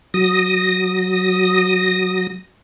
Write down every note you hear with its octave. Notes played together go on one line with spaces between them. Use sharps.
F#3 D#6 A#6